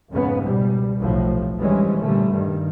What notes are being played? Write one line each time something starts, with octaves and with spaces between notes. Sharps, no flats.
F2 G#2 C#3 B3
C#2 B2 G3
F1 B1 A2 F3
G#2 D3 E3 G3 G#3 C#4
A#2 D3 G3 A3
G2 D#3